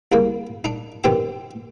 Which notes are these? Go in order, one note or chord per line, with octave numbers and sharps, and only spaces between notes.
C2 C#3 A#3
D4 D#4
F#2 B2 D#3 C4 G4 D6